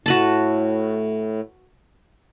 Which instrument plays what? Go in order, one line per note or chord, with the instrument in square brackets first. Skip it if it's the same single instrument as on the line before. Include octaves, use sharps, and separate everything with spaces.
[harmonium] A2 [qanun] F#4 B4 A5